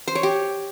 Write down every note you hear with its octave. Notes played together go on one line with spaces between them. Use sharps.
C5
C#5
G4